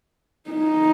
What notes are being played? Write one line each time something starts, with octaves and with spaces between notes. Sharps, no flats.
D#4